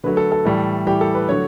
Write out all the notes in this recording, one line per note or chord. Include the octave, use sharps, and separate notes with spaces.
D3 F#3 A3 B4
A4
A4
A2 E3 G3
A2 E3 G3 G4
A4
B4
D3 F#3 A3 C#5